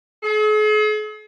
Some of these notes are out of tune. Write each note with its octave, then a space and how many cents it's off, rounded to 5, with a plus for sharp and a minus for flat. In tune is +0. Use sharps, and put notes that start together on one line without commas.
G#4 +45